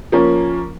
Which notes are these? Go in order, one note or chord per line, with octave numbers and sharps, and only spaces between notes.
F3 A#3 C#4